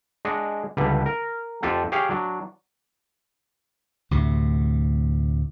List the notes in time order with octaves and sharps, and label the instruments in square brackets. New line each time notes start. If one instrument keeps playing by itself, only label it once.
[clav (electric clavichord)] G#3 D4 D#5 F#5
C#2 D3 G3 B4
A#4
F2 F4 G4 A4 F#5
G4 G#4 C#5 F5 G5
F#3 D4
[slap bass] D2 A2 C3